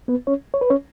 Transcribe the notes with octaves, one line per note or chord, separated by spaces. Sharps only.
B3 B4
C#4 C#5
C#5
B4
C#4 C#5